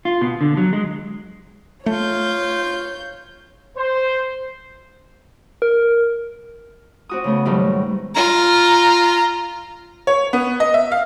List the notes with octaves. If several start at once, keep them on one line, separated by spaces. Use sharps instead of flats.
F4
B2
D3
F#3
G#3
A3 F4 C#5 G6
C5
A#4
C4 F#4 D#6
C#3 A3 B3
G#2 D#3 F#3 G3 A3
F4 A#5
C#5
B3
D#5
E5
F5